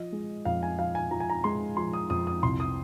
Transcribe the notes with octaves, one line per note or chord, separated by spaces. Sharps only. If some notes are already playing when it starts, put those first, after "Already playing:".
Already playing: F3 D#5
G#3
F2 F5
G#5
F3 F5
G#5
F3 A#5
G#5
A#5
G#3 C6
F3 C6
D#6
F2 D#6
D#6
C2 C6
D#6